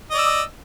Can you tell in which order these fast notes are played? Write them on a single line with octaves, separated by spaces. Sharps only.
D#5 D5 E6